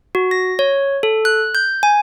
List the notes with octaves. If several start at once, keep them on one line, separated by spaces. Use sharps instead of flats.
F#4
A#6
C#5
A4
F#6
G6
G#5